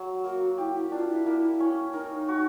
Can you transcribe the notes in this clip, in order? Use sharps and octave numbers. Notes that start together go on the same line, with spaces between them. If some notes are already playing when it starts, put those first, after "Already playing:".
Already playing: F#3
A#3 F#4
E4 G4
E4
D4 F4
E4
A#3
C#4
D#4 A#4
F#4